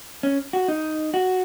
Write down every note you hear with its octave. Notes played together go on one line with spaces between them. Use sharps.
C#4
F#4
D#4
F#4